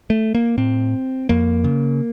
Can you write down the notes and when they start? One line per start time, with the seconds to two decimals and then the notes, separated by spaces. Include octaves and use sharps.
0.10 A3
0.35 A#3
0.58 A2 C4
1.29 F2 A#3
1.64 C#3